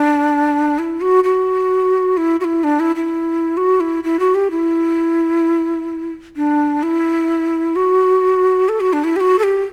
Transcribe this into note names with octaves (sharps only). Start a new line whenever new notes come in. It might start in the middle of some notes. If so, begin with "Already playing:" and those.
Already playing: D4
E4
F#4
F#4
E4
F#4
E4
D4
E4
E4
F#4
E4
E4
F#4
G4
E4
D4
E4
F#4
A4
F#4
D4
E4
G4
F#4
A4
G4